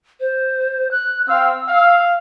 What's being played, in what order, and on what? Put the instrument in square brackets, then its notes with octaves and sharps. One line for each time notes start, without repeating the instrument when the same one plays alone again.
[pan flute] C5
F#6
[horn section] C4 F5 [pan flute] E6
[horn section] F5